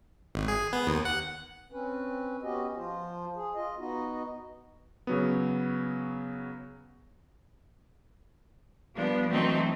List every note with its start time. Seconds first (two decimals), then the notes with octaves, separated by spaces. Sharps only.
0.35 G#1
0.48 G#4
0.73 B3
0.87 D#2
1.05 F#5
1.72 C4 C#4 B4
2.42 B3 C#4 F#4 G4 D#5
2.77 F3 F4 C5
3.36 G#4
3.55 F4 D#5
3.78 B3 D#4 F#4 D#5
5.07 C#3 F#3 B3
8.95 F3 G3 B3 D4
9.28 E3 F#3 A3 C4 D4 D#4